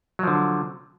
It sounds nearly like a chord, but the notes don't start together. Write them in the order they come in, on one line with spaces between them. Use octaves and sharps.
F#3 F3 D3